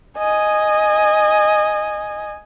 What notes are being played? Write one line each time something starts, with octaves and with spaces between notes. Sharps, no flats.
D#5 G#5